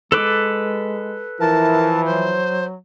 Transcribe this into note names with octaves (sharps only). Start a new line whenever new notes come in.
G#3 A4 B4 D6
E3 F3 E4 A#4 A5
F#3 C5